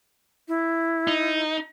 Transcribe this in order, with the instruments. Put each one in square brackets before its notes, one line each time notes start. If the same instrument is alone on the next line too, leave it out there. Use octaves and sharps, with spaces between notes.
[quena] E4
[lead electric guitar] D#4